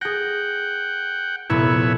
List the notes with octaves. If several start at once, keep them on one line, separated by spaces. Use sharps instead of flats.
G#4 F#5 G5 A#6
F1 A#2 B3 E4 C#5 E5